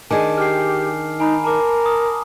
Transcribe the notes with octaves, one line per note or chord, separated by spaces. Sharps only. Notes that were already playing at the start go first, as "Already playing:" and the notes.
D#3 D4 G#4 G#5 A5 D6
G4 F6 C7
D#4 G#5 A#5 B5
A#4 A5 A#5 D6
D#6